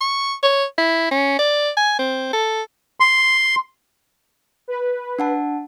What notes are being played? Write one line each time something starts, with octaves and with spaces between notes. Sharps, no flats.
C#6
C#5
E4
C#4
D5
G#5
C4
A4
C6
B4
D4 F#5 A5